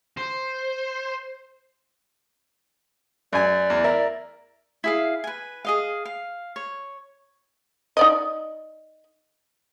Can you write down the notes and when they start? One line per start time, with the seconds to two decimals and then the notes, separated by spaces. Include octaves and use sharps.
0.17 C5
3.33 F#2 D5 G#5
3.70 E2
3.84 E4 A#4
4.84 E4 G#4 F5
5.24 B4 G#5
5.65 G#4 D#5 F5
6.05 F5
6.56 C#5
7.97 D#4 D5 D#5